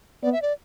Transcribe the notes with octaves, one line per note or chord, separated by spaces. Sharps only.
B3 D5
E5
D5